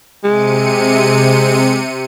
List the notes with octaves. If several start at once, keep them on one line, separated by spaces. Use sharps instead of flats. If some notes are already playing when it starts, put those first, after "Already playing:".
C3 G#3 C#7 D#7